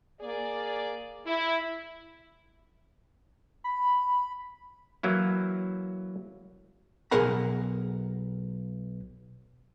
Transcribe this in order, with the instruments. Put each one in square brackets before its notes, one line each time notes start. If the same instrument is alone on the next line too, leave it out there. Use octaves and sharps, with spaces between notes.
[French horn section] A#3 G#4 D5
E4
[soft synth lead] B5
[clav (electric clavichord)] E3 F#3 A#3 E4
[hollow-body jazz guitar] B1 G#4 A#4 F#5 B5